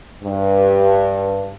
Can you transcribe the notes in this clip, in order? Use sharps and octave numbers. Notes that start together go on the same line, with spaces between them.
G2